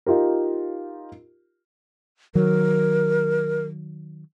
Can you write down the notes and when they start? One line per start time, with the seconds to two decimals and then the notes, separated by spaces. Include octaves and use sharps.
0.06 D#4 F4 G4 A#4
2.35 D#3 F#3 A#4